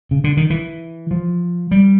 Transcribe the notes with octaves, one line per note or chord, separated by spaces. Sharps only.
C#3
D3
D#3
E3
F3
G3